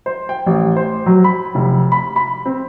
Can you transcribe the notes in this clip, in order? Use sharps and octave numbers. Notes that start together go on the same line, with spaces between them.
C5
G5
A1
C5
F#3
B5
F1
B5
B5
C4